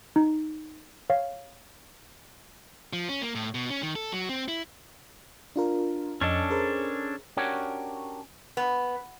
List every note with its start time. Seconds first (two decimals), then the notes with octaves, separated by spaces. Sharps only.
0.16 D#4
1.10 C#5 F5
2.93 F3
3.09 C#4
3.22 A#3
3.35 A2
3.55 B2
3.70 C#4
3.83 D#3
3.95 A4
4.12 F#3
4.29 C4
4.48 E4
5.56 D4 F4 A#4
6.21 F2 C#4 D4 A4 D#5 A6
6.50 G#4 A#4 C5
7.37 C#4 D4 F#4 G4 A#4 C#5
8.57 B3